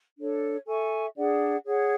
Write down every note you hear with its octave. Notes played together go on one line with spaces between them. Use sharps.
D4 A4 C#5
A4 E5 G#5 C#6
D4 G#4 D5 F#5
G#4 C#5 F#5